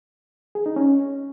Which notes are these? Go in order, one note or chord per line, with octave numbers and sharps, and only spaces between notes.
G#4
D#4
C#4